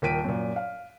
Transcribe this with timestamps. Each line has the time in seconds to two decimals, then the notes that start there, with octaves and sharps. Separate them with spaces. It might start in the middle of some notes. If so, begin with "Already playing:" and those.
0.02 D#1 A#4 G5 B6 D7 D#7
0.24 F#2 A#2
0.56 F5